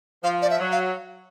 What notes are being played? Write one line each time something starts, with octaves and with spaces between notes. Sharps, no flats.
F3 F5
D5
E5
F#3
F5